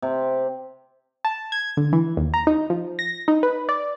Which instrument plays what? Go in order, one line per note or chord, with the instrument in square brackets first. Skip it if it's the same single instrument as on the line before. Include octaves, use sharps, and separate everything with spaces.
[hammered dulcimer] C3
[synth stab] A5
G#6
D3
E3
D#2
A#5
D#4
F3
A#6
D#4
B4
D5